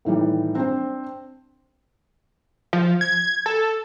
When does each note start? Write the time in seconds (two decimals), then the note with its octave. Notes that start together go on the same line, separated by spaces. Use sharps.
0.05 A2 D#3 E3 G3
0.55 C4 D4 C5
2.73 F3
3.01 G#6
3.46 A4